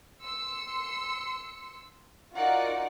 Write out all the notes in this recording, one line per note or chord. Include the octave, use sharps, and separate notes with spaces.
C6 E6 C#7
D#4 F4 F#4 A#4 D5 F#5